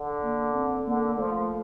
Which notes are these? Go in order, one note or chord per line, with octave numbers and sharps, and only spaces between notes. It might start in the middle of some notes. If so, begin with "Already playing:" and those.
Already playing: D3
A#3
C4
D3 A#3
F3 A3